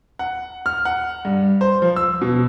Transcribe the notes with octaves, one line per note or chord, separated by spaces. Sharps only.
F#5
F6
F#5
G2
C5
F3
E6
B2